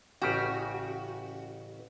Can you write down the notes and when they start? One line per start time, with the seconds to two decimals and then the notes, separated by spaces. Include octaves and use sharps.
0.22 A1 C#3 F#4 G4